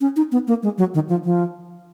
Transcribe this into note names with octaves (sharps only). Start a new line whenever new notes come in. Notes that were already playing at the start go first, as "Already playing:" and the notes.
C#4
D#4
B3
A#3
G#3
F#3
D#3
F3
F3